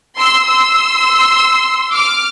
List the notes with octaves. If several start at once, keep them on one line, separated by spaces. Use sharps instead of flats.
C6 E6
C6 E6
D6 F6